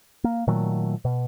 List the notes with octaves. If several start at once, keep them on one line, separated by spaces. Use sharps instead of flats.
A#3
A#2 D#3 F#3 A3
B2